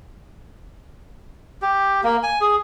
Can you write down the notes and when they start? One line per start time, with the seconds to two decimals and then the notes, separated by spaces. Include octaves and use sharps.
1.62 G4
2.04 A#3
2.23 G#5
2.41 G#4